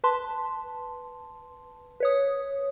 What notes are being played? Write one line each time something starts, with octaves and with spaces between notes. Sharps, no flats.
B4 A5 C6
B4 C#5 D#6